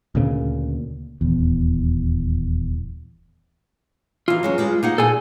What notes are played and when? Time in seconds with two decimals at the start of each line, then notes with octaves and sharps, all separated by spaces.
0.15 D2 A#2 C#3
1.21 D#1 E2
4.28 E3 D#4 F4
4.43 F#3 G#3 C#4
4.58 G3 G#3
4.83 A#3 D#4 F#5
4.98 A#2 G#4 A4 G#5